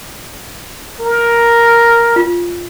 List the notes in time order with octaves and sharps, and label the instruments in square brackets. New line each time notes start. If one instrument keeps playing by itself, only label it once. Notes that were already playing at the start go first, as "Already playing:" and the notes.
[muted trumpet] A#4
[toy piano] F4